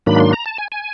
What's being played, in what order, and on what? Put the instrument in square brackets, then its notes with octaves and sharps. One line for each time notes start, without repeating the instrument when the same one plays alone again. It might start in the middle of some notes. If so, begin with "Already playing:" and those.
[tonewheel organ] G#2 D#3 F#3 A#3 D4 B5
C6
A#5
A5
G#5
G#5